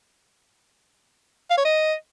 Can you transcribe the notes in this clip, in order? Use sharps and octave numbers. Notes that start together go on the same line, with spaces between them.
F5
C#5
D#5